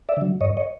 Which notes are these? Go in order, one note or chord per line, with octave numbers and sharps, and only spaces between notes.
D5 E5
D3 F#3
G2 C#5 D#5
C#5 D#5